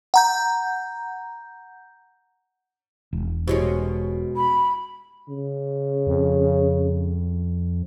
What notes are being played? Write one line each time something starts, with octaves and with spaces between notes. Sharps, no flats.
F#5 A#5 G6
E1
B2 G#3 C#4 E4 G4 C5
B5
C#3
F2